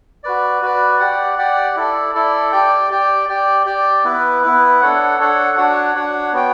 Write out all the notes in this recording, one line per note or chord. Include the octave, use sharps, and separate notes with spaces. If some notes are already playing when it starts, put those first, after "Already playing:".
F#4 B4 D5
F#4 B4 D5
G4 D5 F#5
G4 D5 F#5
E4 A4 D5
E4 A4 D5
G4 D5 G5
G4 D5 G5
G4 D5 G5
G4 D5 G5
B3 E4 B4
B3 E4 B4
D4 A4 C#5 F#5
D4 A4 C#5 F#5
D4 F#4 C#5 F#5
D4 F#4 C#5 F#5
B3 F#4 C#5 G5